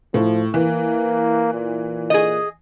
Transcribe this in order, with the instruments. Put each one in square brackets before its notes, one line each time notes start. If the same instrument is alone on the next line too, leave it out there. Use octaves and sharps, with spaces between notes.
[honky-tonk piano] A2 [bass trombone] F3
[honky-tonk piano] E3 [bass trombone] A#3
[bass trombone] A#2
[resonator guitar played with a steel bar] G#4 D#5